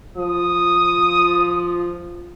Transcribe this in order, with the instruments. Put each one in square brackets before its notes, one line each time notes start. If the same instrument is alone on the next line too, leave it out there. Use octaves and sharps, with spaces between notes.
[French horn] F3 [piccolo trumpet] D#6